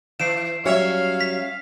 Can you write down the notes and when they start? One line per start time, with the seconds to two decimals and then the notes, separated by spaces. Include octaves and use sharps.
0.20 E3 C7 D7 E7
0.65 F#3 G3 C#4 C#5 E5 F5
1.21 B6